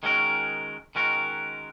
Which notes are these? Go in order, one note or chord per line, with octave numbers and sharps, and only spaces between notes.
D#3 G#3 C#4 F#4 A#4
D#3 G#3 C#4 F#4 A#4